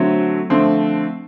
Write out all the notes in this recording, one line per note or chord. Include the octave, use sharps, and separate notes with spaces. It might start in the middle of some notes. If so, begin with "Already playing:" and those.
Already playing: D3 F#3 A3 C4
D3 F3 A3 C4